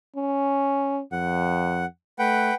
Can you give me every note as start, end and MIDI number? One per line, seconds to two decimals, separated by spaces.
0.16 1.02 61
1.12 1.85 41
1.12 1.85 78
2.19 2.51 57
2.19 2.54 71
2.19 2.54 78
2.19 2.54 79